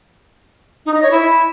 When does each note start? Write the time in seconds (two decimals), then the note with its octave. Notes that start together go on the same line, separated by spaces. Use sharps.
0.86 D#4
0.94 D#5
1.02 C#5
1.11 E4